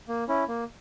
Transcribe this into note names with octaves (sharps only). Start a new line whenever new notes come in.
A#3
C#4 E4
A#3